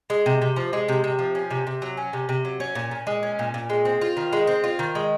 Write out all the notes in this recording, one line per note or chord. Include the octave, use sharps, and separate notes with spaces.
G#3
C3
C3
F3
G#3
C3
C3
F3
C#4
C3
C3
F#3
C#4
C3
C3
F#3
C#4
A#2
A#2
G#3
C#4
A#2
A#2
G#3
C4
F4
D#3
G#3
C4
F4
D#3
G#3